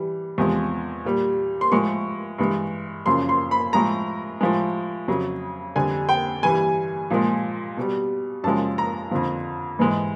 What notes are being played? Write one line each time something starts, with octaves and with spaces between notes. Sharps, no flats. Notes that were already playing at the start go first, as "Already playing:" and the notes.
Already playing: E3 G3
E2 C3 F3 G#3
A#2 G3
C6
A2 F3 G#3 C#6
G2 E3 G#3
F#2 C#3 F3 C6
C6
B5
A2 F3 G#3 A#5
A2 F3 G#3
F2 C#3 F#3
F2 D3 G3 G#5
G5
G2 E3 G3 G#5
A#2 F3 G#3
B2 G3
F#2 C#3 F3 G#3 A5
A#5
F2 D3 F3
G#2 E3 G#3